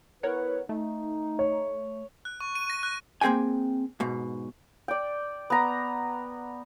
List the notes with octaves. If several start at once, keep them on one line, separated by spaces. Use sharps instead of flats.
B3 E4 A#4 B4 C#5 F#5
A3 D#4
C#5
F#6
C#6
D#7
A#6
F#6
A#3 C4 G#4 G5 G#5
G#2 B2
D5 G5
B3 A#5